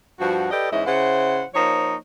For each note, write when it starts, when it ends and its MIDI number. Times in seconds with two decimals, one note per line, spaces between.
0.19 0.50 43
0.19 0.50 53
0.19 0.50 66
0.51 0.69 67
0.51 0.69 69
0.51 0.69 71
0.51 0.69 74
0.51 0.69 75
0.71 0.87 44
0.71 0.87 52
0.71 0.87 61
0.71 0.87 64
0.71 0.87 75
0.87 1.44 49
0.87 1.44 64
0.87 1.44 72
0.87 1.44 78
1.55 1.96 53
1.55 1.96 58
1.55 1.96 63
1.55 1.96 72
1.55 1.96 73